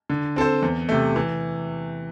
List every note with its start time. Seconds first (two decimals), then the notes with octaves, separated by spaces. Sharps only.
0.10 D3
0.36 C4 A4 C5
0.62 E2
0.89 C3 A3
1.16 E3